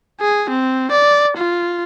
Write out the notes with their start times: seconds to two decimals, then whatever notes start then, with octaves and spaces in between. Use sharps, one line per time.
0.20 G#4
0.49 C4
0.91 D5
1.37 F4